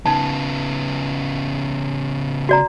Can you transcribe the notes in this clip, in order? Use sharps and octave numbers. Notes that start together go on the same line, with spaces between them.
C#3 B3 D#4 A5
F#4 D5 A#5